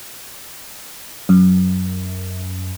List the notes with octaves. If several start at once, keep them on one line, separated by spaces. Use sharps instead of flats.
F#2